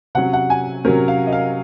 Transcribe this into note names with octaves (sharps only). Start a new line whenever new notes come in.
C3 F#3 C#4 F#5
F#5
G#5
C3 F#3 C#4 A#4
F5
D#5
F5